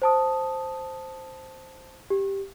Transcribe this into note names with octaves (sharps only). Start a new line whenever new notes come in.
C5 A5 D#6
G4